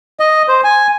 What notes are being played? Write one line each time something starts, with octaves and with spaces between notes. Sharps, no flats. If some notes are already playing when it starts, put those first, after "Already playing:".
D#5
C5
G#5